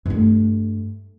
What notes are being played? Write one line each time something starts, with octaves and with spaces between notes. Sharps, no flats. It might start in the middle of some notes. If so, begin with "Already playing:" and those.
G2 A3